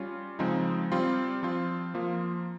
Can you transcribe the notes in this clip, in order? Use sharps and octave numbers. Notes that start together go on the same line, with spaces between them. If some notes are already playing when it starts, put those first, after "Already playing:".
Already playing: G3 C#4 F4
C#3 F3 G#3 C4 D#4
G3 C4 F4
F3 C4 F4
F3 A#3 F4